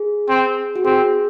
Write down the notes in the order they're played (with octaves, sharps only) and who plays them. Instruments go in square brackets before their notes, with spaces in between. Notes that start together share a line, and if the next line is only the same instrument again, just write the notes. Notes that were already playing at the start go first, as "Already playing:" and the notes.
Already playing: [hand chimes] G#4
[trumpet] C4
[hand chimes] F#4
[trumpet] C4 [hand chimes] G#4